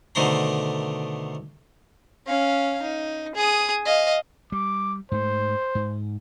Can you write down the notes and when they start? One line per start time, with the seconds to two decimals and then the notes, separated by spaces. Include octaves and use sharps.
0.15 B2 D3 D#3 A3 C5 A#5
2.26 C#4 F5
2.82 D#4
3.35 G#4 D#6
3.86 D#5 F5
4.52 G3 D6
5.12 G#2 A3 C5
5.75 G#2